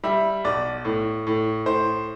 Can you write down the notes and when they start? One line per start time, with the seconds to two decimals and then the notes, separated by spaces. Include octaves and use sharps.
0.04 G3 E5
0.44 B1 D5
0.85 A2
1.27 A2
1.66 A2 C5